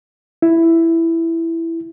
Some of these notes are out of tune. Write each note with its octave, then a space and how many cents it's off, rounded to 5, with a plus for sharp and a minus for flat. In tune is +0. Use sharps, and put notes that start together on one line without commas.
E4 +5